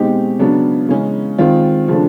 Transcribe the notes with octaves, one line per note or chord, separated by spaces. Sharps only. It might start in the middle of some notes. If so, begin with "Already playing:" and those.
Already playing: B2 G#3 C4 D#4 G4
C#3 F#3 B3 D4
C#3 E3 G#3 C#4
D#3 G#3 C4 F4
C#3 F3 A3 D4